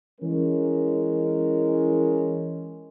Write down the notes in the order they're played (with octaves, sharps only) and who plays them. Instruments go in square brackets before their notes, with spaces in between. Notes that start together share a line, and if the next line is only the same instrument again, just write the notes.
[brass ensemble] E3 G#3 C#4 A#4